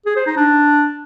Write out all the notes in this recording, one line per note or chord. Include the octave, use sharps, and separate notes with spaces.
G#4
C5
D#4
D4